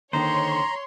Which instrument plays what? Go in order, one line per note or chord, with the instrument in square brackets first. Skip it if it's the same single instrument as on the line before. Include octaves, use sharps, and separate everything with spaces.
[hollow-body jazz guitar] D#2 D3 D#3 [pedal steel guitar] C5 [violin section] C#5 C6 [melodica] A#5